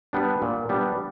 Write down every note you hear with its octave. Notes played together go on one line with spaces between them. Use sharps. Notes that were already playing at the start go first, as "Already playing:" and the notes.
G3 B3 D4
A#2
G3 B3 D4